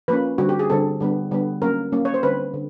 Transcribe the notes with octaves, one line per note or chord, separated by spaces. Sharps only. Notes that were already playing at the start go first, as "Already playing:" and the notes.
F3 A#3 C#4 B4
D3 G3 C4 F#4
G4
G#4
D3 G3 C4 A4
D3 G3 B3
D3 G3 B3
F#3 A#3 C#4 A#4
F#3 A#3 C#4
C#5
C5
D3 G3 C4 B4
D3